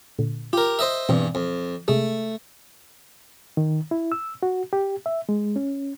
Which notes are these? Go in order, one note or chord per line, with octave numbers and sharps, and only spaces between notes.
A#2 D3
F4 G4 A#4
C5 D#5 E5
E2 G2 B2 E3 C4
F2
C3 G#3 A3 G#4
D#3
E4
E6
F#4
G4
E5
G#3
C#4